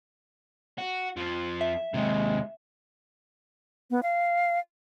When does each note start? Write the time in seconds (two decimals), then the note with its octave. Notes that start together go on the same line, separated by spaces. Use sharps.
0.78 F#4
1.17 F2 F3
1.61 E5
1.94 D#2 C3 G#3
3.90 B3
4.03 F5